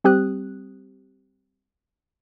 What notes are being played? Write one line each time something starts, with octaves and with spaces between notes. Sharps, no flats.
G3 C4 G4 D#6 F#6